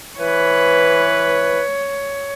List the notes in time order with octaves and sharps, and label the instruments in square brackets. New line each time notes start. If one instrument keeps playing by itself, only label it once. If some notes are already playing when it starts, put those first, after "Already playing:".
[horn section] E3 B4 [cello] C#5